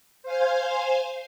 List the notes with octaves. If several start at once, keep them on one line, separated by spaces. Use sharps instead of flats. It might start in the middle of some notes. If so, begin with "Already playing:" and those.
C5 F5 G#5